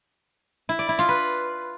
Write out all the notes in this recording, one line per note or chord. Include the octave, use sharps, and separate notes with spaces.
E4
D5
E4
F4
B4